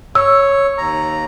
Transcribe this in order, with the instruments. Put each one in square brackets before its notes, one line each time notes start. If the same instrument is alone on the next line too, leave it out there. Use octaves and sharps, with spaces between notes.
[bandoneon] C#5 [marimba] E6
[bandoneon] D#2 A#5